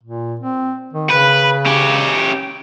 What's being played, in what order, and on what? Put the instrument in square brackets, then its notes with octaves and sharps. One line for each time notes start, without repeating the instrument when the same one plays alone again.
[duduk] A#2
C4
D#3
[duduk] C#3 [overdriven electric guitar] B4
[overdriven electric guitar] C#4 G4